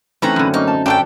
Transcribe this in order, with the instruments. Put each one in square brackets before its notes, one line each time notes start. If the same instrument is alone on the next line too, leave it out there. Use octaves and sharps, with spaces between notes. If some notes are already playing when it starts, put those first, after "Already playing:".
[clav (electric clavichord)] E3 [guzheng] A3 [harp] C4 C#4 D#4 [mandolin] B4 A#5
[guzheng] F#2 D3
[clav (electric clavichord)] F#3 A#3 C#4 [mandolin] D#4
[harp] A5
[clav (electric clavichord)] F#2 A3 [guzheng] D4 [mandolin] G4 A4 G5